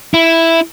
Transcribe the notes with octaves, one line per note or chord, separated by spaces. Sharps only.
E4